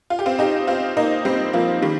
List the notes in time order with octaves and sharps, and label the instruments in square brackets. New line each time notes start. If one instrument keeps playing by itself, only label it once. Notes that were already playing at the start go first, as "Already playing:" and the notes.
[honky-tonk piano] F4
G4
C4 F4
D#4 G4
C4 F4
A#3 D#4
G3 C4
F3 A#3
D#3 G3